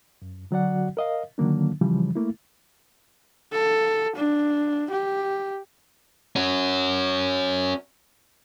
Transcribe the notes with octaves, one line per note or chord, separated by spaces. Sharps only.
F#2
D3 F#3 F#4 D5 F#5
A#4 D#5 F5
D3 D#3 F#3 A#3 D4
C#3 E3 F3 G3
A3 A#3 E4
A4
D4
G4
C#4 F#4